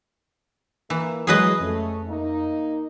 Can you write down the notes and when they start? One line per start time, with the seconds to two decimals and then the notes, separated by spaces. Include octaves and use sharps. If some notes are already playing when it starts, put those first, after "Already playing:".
0.90 E3 A#3
1.27 F#2 E3 F#3 G#3 G#4 B4 C#5 D#5
1.60 F2 A3 C#4
2.08 A#3 D#4